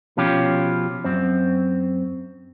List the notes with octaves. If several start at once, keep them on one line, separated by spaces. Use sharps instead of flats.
B2 F3 C#4 F4 G4
F#2 C4